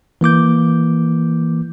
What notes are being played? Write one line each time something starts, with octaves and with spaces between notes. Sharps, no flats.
E3 A#3 D6 G6